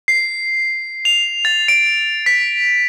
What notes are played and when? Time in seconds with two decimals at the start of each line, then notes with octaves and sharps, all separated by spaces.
0.08 C7
1.05 F7
1.45 A6
1.68 D7
2.26 B6